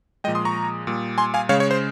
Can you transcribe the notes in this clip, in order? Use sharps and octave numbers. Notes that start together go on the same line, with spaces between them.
A#2 F3 G#3 D#5 G5
C6 D#6
A#5 C#6
A#2 G3
G#5 C6
F5 G#5
C#3 G#3 C#5 F5
C#5
C5